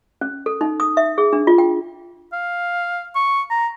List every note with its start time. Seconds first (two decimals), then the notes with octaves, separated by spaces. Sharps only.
0.21 C#4
0.46 A4
0.61 D#4
0.80 D#6
0.97 E5
1.18 G#4
1.33 D4
1.47 F4
1.58 G5
2.33 F5
3.15 C#6
3.51 A#5